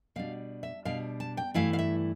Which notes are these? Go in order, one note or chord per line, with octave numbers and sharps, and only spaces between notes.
B2 G3 D4 F5
E5
B2 G3 D4 F5
A5
G5
G2 E3 A3 E4 F5
F5
E5